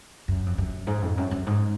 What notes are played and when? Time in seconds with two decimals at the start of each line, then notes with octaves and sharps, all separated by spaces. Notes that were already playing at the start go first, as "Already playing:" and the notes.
0.28 F#2
0.46 F2
0.58 F#2
0.87 G#2
1.02 F2
1.17 F#2
1.31 F#2
1.46 G#2